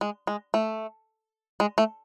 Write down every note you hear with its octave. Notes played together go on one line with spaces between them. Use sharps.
G#3
G#3
A3
G#3
A3